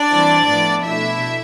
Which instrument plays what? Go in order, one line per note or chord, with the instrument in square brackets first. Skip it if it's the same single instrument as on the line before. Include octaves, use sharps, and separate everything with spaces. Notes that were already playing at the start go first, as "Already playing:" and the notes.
Already playing: [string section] D4 D5
E3 G3 C4 E4
A2 F3 B3 E4
B2 A3 D4 E4 E5